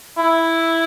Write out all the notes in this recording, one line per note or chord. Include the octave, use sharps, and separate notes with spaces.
E4